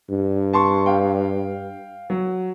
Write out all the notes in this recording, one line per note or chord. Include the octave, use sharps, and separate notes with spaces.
G2
A5 C6 C#6
F5 G5
F#3